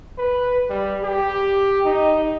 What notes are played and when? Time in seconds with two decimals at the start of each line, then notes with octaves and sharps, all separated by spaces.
0.18 B4
0.69 G3
1.04 G4
1.85 D#4